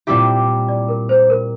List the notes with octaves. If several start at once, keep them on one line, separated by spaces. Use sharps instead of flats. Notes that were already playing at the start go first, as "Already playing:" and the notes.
A#2 G3 C4 E4 G4 E5
D5
A#4
C5
A#4